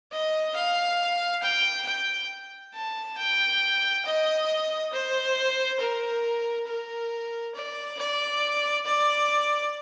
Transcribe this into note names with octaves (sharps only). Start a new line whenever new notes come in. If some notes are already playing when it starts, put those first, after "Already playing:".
D#5
F5
G5
G5
A5
G5
D#5
C5
A#4
A#4
D5
D5
D5